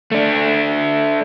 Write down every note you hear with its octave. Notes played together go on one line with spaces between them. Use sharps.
A3 D4